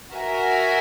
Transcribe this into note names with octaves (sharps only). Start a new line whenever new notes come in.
F#4 A#4 E5 G#5